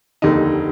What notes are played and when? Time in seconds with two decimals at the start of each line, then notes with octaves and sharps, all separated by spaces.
0.22 F1 D#2 D3 D#4